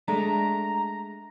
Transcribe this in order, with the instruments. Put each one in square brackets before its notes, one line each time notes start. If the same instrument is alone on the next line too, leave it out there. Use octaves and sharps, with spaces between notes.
[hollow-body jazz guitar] G#3 A3 D4 [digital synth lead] A#5